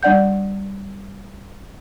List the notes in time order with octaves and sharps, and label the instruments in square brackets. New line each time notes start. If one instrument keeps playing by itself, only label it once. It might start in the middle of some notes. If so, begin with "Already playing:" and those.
[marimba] G3 D4 D5 F#5 G6